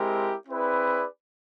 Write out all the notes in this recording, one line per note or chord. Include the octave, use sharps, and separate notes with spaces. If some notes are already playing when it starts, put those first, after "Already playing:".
Already playing: G#3 C4 E4 G4 A#4
C4 E4 G#4 B4 D5